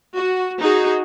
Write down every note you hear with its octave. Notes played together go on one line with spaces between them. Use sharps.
F#4
D#4 F#4 G#4